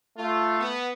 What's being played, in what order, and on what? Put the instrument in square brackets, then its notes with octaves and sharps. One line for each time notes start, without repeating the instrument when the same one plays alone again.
[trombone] A3 [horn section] F4
[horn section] B3